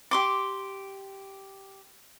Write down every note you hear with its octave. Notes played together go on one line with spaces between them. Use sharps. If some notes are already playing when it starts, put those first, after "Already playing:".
G4 C6 D6